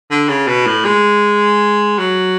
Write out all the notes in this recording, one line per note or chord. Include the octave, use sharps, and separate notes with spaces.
D3
C#3
B2
A2
G#3
F#3